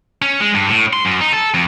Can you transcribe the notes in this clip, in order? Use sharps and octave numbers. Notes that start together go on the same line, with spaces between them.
C#4
G#3
G2
A2
C6
F#2
D#4
A4
F2